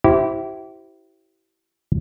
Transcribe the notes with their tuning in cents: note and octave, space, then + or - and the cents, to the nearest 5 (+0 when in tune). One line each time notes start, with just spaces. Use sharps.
E4 +0 G4 -35 C5 +0